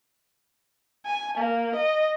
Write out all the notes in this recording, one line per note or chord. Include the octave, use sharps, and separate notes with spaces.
G#5
A#3
D#5